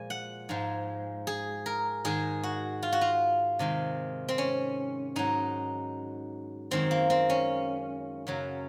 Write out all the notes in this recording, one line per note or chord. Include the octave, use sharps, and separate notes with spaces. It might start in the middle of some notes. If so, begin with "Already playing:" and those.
Already playing: A#2 F3 G#3 G#5
F#5
G#2 F3 G#3
G#4
A#4
G#2 D#3 G#3 G#4
F#4
F4
F#4
F4
C3 D#3 G#3
C4
C#4
G#2 F#3 D#4
F#2 D#3 G#3 C4
A#3
C4
C#4
F#2 C#3 F#3